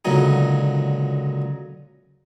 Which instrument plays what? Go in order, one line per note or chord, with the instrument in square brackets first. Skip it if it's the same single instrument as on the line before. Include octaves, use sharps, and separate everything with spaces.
[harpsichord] C#2 A#2 D3 F#3 D#4